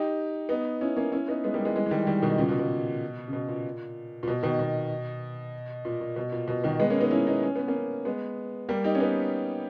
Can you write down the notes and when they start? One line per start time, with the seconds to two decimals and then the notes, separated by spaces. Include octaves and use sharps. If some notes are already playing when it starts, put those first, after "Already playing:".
Already playing: D#4 G4
0.49 B3 D#4
0.81 C#4 E4
0.96 A#3 C#4
1.12 C#4 E4
1.28 B3 D#4
1.44 G#3 B3
1.54 G3 A#3
1.65 E3 G#3
1.76 E3 G#3
1.86 E3
1.91 D#3 G3
2.07 D#3 G3
2.22 B2 D#3
2.38 A#2 C#3
2.48 B2
2.59 B2
3.28 C#3
3.33 B2
3.48 A#2
4.23 A#2
4.28 B2
4.43 B2 D#3
4.59 B2
5.85 A#2
6.01 A#2
6.16 B2
6.32 A#2
6.48 B2
6.64 B2 D#3
6.80 G#3 B3
6.90 A#3 C#4
7.00 B3 D#4
7.11 C#4 E4
7.27 B3 D#4
7.43 C#4
7.56 B3
7.68 A#3 C#4
8.05 G#3 B3
8.69 G3 A#3
8.84 D#4 G4
8.95 C#4
9.00 B3 D#4